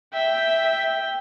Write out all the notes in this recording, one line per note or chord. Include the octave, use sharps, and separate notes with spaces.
E5 G5